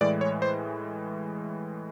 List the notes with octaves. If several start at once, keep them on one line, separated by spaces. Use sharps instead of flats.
A2 E3 G#3 D5
C#5
C5